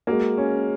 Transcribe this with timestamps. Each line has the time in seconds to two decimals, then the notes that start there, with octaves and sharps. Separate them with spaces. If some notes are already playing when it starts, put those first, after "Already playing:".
0.07 G#3 A#3 F#4
0.37 C#4